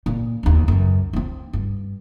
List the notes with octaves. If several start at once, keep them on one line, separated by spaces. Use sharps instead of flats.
A#2
D#2 D4
C#2 F#2
B3 C4
G2